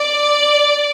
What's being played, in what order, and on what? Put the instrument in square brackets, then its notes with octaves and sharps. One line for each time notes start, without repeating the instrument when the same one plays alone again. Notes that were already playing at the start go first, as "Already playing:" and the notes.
Already playing: [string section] D5